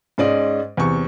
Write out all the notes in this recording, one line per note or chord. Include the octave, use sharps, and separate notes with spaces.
G#2 G#3 C#4 D5 D#5
E2 C3 C#6